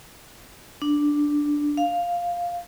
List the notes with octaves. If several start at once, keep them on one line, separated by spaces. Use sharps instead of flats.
D4
F5